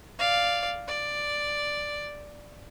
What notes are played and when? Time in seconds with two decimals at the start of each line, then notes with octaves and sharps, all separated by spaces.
0.19 D5 F5
0.88 D5